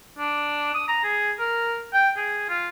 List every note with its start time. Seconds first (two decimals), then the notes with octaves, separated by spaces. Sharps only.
0.19 D4
0.75 D#6
0.88 A#5
1.04 G#4
1.40 A#4
1.94 G5
2.17 G#4
2.49 F4